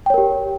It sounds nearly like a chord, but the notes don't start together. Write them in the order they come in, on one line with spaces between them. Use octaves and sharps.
G5 C#5 A#4 G4